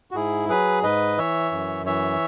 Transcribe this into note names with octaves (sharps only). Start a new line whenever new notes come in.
F#4
G#2 E4 G#4
F#3 G#4 B4
G#2 B4 D#5
E3 C#5 E5
F#2
E3 C#5 E5